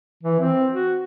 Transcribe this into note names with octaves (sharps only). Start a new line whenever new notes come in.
E3
C4
F#4